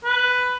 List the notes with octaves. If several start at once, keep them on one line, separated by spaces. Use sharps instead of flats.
B4